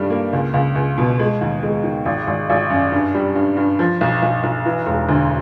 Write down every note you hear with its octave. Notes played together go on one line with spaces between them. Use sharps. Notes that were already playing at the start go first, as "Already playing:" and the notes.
Already playing: G2 D#3 G3 A3
A#3
C#2
C#2
C#2
B2
G#3
D#2
G#3
D#3
G#1
G#1
G#1
F#2
G2
G3
G2
G2
F3
B1
B1
B1
E3
E1
D2